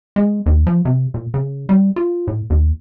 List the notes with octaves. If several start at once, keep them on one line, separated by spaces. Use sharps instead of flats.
G#3
D#2
F3
C3
A#2
C#3
G3
F4
A2
D#2